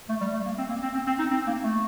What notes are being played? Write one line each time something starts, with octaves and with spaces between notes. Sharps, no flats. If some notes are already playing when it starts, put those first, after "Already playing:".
A3
G3
A3
A#3
C4
A#3
C4
C4
C4
D#4
C4
A#3
A3